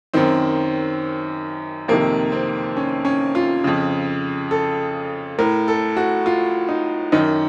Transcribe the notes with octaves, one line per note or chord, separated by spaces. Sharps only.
F#2 D#3 C4
F2 C3 D#3 A#3
C4
C#4
C#4
F4
F2 C#3
A4
A2 A#4
A4
F#4
F4
D#4
F#2 D#3 D#4